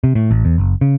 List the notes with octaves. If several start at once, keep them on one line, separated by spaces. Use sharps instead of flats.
C3
A2
A1
E2
F#1
C#3